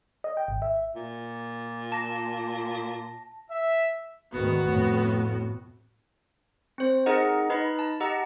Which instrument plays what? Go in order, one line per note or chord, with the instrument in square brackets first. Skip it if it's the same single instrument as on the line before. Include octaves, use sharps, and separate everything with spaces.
[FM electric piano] D#5
G5
G#1
E5
[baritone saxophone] A#2
[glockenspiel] A5 A#6
[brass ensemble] E5
[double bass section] D2 G#2 D#3 [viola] B3 F#4
[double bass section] F2 A2
[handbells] C4 C5
D#4 G#4 A#4 D#5 F#5 A#5
D#4 B4 D#5 B5
A5
G4 D#5 F#5 A#5 E6